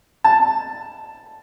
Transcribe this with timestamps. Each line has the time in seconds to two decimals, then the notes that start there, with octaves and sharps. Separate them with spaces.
0.24 A5